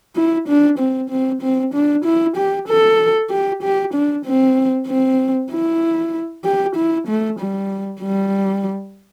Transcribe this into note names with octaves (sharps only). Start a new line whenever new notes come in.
E4
D4
C4
C4
C4
D4
E4
G4
A4
G4
G4
D4
C4
C4
E4
G4
E4
A3
G3
G3